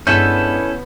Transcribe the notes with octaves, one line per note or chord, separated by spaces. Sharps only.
G2 G#3 B3 C#4 E4 A4 G6